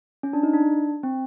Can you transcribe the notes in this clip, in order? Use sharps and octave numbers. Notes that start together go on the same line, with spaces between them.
C#4
D4
D#4
D4
C4